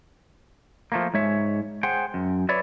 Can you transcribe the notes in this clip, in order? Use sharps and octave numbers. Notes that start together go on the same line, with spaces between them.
F3 A3 A#3
G#2 G#3 C#5 E5
G#4 C5 F#5 G5
F#2
B4 C#5 D5 E5